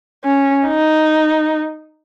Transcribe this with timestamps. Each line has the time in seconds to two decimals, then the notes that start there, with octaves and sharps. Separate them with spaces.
0.24 C#4
0.67 D#4